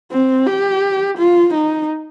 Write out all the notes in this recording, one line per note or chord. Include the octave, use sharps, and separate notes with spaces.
C4
G4
F4
D#4